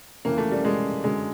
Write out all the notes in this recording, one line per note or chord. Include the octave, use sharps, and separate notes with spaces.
F2 C#3 E3 A#3
A3
G3
G#3
F#2 D3 F#3 G#3